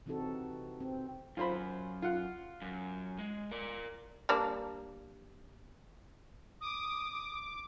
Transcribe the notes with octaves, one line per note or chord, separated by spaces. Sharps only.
C3 E3 C4 D#4 F#4 A4
C4
F#2 F4 C5 B5
F4 F#5
F#2
G#3
A#4 D5
G3 A#3 D4
D6 D#6